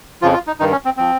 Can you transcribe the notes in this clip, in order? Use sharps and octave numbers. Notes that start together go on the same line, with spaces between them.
F2 C#3 F3 F4
F4
D#4
G2 D#3 D#4
C#4
C4
F3 C4